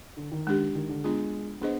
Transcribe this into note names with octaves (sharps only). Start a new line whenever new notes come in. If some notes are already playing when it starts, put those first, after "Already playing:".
D3
D#3
G#3 D4 G4
D#3
D3
G#3 B3 D4 F4 G#4
B3 D4 G#4 C5 D#5